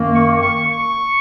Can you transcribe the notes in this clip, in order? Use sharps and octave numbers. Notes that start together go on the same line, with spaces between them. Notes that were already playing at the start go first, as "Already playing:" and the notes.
Already playing: F#2 D#3 A#3
C#6
C#6
C#6